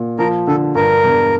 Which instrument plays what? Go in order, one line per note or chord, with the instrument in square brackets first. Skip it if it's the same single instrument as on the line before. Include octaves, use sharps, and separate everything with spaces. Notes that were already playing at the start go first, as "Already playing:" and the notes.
Already playing: [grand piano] A#2
[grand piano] F3 [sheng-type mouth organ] A#4
[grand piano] D3 [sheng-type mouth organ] A4
[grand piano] G2 [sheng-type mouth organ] A#4
[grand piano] E1